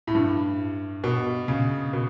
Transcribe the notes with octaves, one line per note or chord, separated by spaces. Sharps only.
A2
G2
B2
C#3
B2